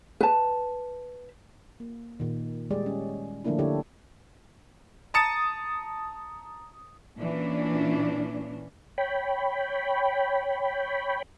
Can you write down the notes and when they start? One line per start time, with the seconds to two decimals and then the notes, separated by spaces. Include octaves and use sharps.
0.21 B4 A5
1.80 A#3
2.20 A#2 D#3
2.71 G3 G#3 G4 G#4 D5
2.86 C#4
3.45 D3 F3 A3 A#3 D4 E4
3.58 D3 D4 E4 G4 A4 C#5
5.14 A5 A#5 D#6 A6 C#7 E7
7.18 A#2 E3 C#4 D4
8.98 C#5 G5 B5